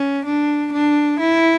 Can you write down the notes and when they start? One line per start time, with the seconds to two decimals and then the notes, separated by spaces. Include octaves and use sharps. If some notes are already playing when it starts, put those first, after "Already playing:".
Already playing: C#4
0.25 D4
0.72 D4
1.19 E4